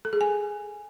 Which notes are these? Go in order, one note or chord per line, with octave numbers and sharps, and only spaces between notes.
A4
G#4
G#5